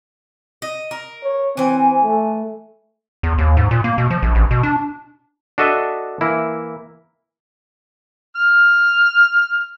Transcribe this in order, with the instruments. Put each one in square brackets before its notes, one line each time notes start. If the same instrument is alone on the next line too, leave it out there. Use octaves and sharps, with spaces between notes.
[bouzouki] D#5
A#4
[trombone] C#5
[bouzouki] E3 G#5 [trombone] C4
[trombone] A3
[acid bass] E2
D#2
G#2
A#2
A#3
B2
F3
A#1
A1
B2
D4
[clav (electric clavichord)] D4 F#4 A4 D#5 E5
E3 A#3 E4
[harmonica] F6